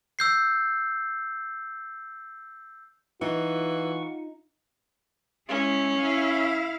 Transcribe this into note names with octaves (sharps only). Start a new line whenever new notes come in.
E6 G6 C7
E3 D#4 F4 F#5 C#6
G#3 C#4 E4
E4 F5